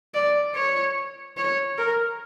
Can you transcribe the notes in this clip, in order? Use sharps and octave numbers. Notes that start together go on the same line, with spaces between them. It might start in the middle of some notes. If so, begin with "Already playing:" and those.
D5
C#5
C#5
A#4